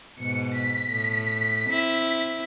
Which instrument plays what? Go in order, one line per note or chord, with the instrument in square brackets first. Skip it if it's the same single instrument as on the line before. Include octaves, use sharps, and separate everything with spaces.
[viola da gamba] G#2 B2 [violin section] C#7
[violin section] B6
[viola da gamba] A2
C4 E4